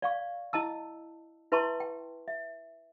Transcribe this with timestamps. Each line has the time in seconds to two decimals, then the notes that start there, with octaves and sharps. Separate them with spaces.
0.02 D5 F5 C#6
0.53 E4 D#5 A5 E6
1.52 E4 B4 E5 A5 C6 C#6
1.80 G5
2.28 E5